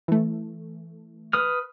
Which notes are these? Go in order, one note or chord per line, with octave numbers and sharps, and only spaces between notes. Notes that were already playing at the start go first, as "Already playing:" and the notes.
E3 A3
B4 D#6 F6